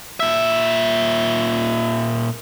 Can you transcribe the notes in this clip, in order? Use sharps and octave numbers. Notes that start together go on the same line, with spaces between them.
A#2 E5